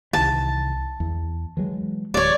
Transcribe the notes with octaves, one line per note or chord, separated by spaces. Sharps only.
C2 D#3 E3 A5
E2
E3 F#3 G#3
D1 C#5 D5